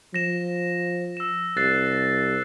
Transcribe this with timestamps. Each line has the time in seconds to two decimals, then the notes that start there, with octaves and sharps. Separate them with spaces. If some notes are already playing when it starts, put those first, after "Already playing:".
0.14 F3 A#6 E7
1.17 E6 E7
1.57 C2 F#6 A6 C7